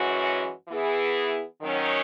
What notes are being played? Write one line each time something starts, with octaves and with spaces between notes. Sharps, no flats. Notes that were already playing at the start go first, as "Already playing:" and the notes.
Already playing: F#2 E3 G#3 C#4 F#4
E3 B3 E4 G#4
D#3 F#3 C#4